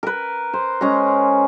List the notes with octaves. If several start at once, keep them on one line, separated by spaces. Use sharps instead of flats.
A#4 B4
C5
G#3 C#4 C5 A#5